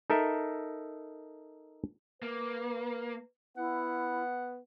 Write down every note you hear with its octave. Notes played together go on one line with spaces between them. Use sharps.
D#4 A4 A#4 E5
A#3 B4
B3 E4 F#5